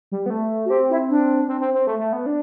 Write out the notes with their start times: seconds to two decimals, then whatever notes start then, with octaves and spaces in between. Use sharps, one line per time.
0.12 G3
0.26 B3
0.30 A3
0.65 F#4
0.70 C4 G4
0.89 E4
1.09 D4
1.48 C4
1.61 C4
1.74 C4
1.87 A3
1.99 A3
2.13 B3
2.26 D4